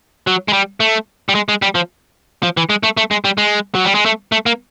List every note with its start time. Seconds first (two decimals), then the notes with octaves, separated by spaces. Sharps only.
0.27 F#3
0.48 G#3
0.53 G3
0.80 A3
1.29 G3
1.35 G#3
1.49 G#3
1.62 G3
1.75 F3
2.43 F3
2.57 E3
2.70 G#3
2.83 A3
2.97 A3
3.11 G#3
3.25 G3
3.38 G#3
3.75 F#3
3.85 G3
3.95 G#3
4.06 A3
4.32 A3
4.46 A#3